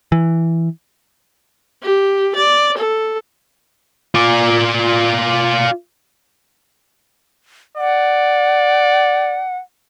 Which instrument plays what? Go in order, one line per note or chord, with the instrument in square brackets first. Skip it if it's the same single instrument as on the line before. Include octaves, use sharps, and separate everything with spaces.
[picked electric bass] E3
[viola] G4
D5
A4
[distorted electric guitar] F4 D5
[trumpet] D5 [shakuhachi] F#5